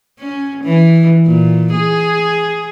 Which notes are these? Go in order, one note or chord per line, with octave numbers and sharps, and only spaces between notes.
C#4
E3
A#2
G#4